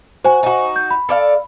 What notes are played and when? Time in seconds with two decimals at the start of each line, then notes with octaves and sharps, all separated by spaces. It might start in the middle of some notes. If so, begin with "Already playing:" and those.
0.25 F#4 C5 G#5
0.43 D#4 F#4
0.76 G6
0.91 B5
1.09 A4 D5 F5